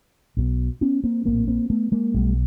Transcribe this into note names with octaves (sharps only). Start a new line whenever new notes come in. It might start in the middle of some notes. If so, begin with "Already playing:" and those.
B1 B2
B3 C#4
A#3 C4
A#1 A2 A#3 C4
A#3 C4
A3 B3
G#3 A#3
B1 B2 G3 A3